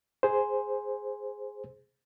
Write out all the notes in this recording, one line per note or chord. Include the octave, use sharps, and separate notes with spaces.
G#4 C5